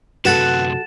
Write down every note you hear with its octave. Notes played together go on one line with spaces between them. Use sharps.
F#2 C3 F#4 A4 B4 F#5 A6 E7